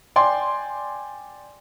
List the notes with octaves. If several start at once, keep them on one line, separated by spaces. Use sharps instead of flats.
D5 G5 G#5 C6